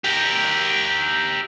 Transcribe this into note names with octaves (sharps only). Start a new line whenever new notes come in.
G4 A#4